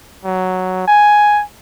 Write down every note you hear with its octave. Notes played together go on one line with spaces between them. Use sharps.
F#3
G#5